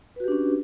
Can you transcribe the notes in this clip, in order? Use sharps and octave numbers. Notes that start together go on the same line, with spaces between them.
C#4 D4 F#4 G4 B4